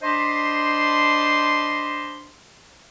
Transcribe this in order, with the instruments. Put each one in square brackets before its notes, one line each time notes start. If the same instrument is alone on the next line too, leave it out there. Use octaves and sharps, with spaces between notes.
[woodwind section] D4 C5 D#5 A5 B5 C6